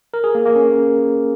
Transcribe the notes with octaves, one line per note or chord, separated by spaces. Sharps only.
A#4
G#4
A#3
A#3
C#4